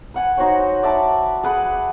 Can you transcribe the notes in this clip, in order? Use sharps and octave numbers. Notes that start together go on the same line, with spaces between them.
B4 F#5 G#5
D#4 F#4 C5 C#5
D5 E5 A5 B5
G#4 B4 F#5